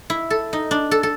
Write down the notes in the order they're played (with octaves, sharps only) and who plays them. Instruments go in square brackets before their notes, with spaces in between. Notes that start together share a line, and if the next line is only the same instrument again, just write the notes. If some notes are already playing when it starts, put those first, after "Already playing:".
[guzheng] E4
A4
D#4
D4
A4
A4